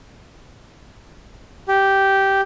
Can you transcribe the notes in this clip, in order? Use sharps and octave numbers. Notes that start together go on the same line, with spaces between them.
G4